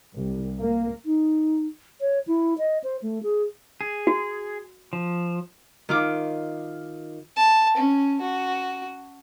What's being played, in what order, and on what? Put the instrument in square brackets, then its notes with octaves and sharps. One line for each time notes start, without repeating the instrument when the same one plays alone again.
[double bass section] C2
A#3
[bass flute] D#4
C#5
E4
D#5
C5
A3
G#4
[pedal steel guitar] G#4
[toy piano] F#4
[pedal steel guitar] F3
[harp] D#3 F4 D6
[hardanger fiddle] A5
C#4
F#4